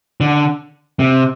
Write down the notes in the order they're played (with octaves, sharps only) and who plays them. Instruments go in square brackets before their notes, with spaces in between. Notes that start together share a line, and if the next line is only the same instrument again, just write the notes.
[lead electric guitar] D3
C3